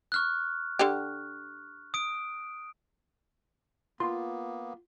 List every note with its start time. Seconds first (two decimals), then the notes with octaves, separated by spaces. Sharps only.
0.12 C#6 F6 F#6
0.79 D3 G4
1.94 D#6 D7
4.00 A#3 B3 F4 C6